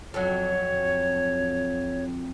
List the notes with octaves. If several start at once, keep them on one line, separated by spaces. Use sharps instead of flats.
F2 F#3 C#5